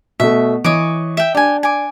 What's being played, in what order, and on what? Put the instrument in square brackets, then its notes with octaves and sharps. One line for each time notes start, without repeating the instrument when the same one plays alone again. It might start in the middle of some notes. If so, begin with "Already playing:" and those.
[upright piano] B2 A3 [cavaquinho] E5
[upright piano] E3 [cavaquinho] C#5 D#5 D6
[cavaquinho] E5 G5
[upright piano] D4 [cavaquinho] G4 G#5
[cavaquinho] G#5 D6